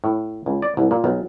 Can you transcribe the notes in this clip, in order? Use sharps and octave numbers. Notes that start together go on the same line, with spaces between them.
A2
C#2
D5
C2
A#2
B1